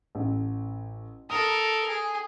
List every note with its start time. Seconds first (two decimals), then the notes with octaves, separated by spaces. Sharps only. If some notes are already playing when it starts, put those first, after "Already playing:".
0.15 A1
1.30 A4 A#4 D#6
1.88 G#4